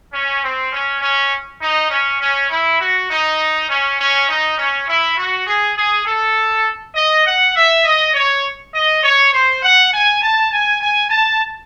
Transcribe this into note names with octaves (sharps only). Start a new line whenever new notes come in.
C#4
C4
C#4
C#4
D#4
C#4
C#4
E4
F#4
D#4
C#4
C#4
D#4
C#4
E4
F#4
G#4
G#4
A4
D#5
F#5
E5
D#5
C#5
D#5
C#5
C5
F#5
G#5
A5
G#5
G#5
A5